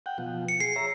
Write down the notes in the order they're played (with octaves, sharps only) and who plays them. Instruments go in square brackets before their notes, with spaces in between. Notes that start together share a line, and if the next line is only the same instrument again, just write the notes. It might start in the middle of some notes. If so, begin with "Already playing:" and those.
[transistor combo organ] F#5 G5
B2 F3
[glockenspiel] C#7
[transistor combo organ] G#4 [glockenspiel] C7
[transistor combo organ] C#5 E5 A#5